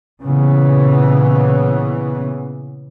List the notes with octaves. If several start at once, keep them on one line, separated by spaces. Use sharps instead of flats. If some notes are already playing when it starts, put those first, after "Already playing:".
A#2 C#3 E3 B3